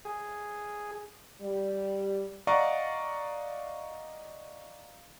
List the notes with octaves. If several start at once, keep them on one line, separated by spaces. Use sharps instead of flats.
G#4
G3
D5 D#5 F5 F#5 A#5 C#6